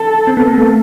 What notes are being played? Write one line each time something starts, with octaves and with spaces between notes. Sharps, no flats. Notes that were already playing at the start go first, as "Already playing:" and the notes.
Already playing: A4
C4
B3
A#3
A3